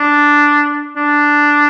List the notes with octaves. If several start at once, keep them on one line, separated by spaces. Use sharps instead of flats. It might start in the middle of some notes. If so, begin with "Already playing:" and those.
Already playing: D4
D4